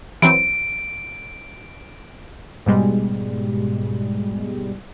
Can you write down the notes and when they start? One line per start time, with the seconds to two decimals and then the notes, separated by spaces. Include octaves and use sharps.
0.22 E3 F#3 C4 D7
2.66 G#2 B2 G3 G#3